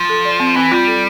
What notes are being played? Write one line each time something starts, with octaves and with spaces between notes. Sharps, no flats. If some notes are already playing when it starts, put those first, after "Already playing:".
Already playing: F3
A4
D5
C4
E3 C4
G3 F4
A4